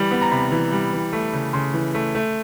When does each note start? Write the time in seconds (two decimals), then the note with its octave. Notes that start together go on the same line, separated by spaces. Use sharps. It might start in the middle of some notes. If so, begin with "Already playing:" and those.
Already playing: E3 G3
0.11 B3
0.21 A#5
0.32 C3 B5
0.52 E3
0.72 G3
0.93 E3
1.13 A3
1.33 C#3
1.53 C#3 C6
1.74 E3
1.95 A3
2.15 A3